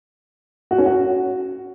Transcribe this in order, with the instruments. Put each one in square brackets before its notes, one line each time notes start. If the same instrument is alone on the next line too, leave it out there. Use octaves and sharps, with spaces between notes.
[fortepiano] F#4
C#4
F#4